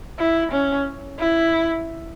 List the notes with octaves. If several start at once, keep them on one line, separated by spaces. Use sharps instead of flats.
E4
C#4
E4